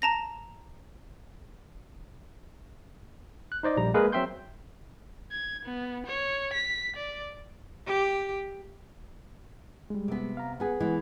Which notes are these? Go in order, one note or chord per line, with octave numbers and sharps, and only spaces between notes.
A5 A#5 A#6
F#6
D#4 C5 D5 D#5
A#1 G3 A#5
G#3 A#3 G#4 A#4 B4
F#3 C4 E5 G5 C6 G6
G#6
B3
C#5
B6
D5
G4
G3 G#3
C3 B3
F5 A#5
B3 G#4 B4 F#5 G#5
E3 G#3 B3